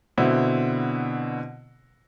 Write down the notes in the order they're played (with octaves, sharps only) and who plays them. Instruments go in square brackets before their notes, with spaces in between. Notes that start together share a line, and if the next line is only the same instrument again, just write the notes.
[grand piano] B2 D3 C4 E4